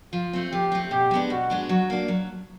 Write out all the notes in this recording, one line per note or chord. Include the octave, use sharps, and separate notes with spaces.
F3 F4
A3 C4
F3 G4
A3 C4
B2 G4
G#3 B3 D4
B2 F#4
G#3 B3 D4
F#3 F#4
A#3 D4
F#3